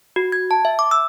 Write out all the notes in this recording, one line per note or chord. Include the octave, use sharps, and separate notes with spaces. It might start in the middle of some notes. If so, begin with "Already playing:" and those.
F#4
G#6
A5
E5
D6
E6